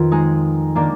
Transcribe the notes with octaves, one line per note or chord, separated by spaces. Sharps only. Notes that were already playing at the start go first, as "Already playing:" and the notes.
Already playing: F2 D#3 A#3 F4 B4
G#3 D#4 G#4
D#3 A#3 D4